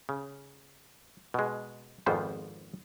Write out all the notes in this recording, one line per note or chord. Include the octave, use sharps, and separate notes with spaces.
C#3
B2 G#3
G#1 F2 G#2 F3 B3 C5